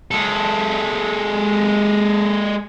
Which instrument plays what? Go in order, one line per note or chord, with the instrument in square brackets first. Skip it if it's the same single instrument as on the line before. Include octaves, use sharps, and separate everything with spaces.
[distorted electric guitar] G#3 A4